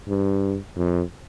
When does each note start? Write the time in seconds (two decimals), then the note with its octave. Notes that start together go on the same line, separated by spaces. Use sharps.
0.08 G2
0.77 F2